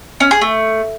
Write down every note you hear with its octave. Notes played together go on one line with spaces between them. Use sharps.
C#4
G#4
A3